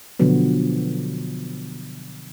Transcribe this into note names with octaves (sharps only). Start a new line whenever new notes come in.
B2 D3 F3 F#3 B3